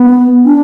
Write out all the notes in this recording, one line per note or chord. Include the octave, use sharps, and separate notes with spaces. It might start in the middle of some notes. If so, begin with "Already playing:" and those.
Already playing: B3
D4